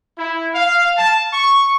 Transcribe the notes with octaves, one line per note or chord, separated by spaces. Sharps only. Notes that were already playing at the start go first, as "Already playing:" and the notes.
E4
F5
A5
C#6